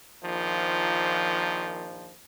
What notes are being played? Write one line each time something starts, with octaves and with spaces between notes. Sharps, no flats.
A#1 D#3 F3